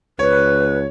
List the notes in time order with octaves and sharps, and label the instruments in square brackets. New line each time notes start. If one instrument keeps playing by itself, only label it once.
[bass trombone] C#2 [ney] B4 [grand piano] C#5